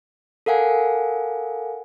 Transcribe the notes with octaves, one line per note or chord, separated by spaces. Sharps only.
A4 A#4 F5 F#5 G#5